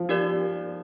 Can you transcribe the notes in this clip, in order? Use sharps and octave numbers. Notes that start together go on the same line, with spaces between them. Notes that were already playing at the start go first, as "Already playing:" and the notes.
Already playing: F3
D#4 G4 A#4 D5